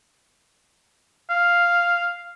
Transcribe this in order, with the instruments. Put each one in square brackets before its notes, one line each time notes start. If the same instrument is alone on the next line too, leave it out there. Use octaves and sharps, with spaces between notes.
[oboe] F5